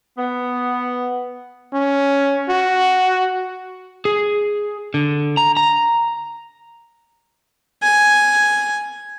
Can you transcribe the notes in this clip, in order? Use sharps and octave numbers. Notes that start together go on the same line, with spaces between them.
B3
C#4
F#4
G#4
D3
A#5
A#5
G#5